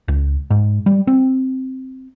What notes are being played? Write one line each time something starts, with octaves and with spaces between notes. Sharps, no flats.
C#2
G#2
G3
C4